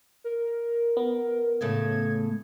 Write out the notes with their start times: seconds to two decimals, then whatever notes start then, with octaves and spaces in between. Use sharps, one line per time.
0.24 A#4
0.97 B3
1.61 A2 C#3 A3 G#6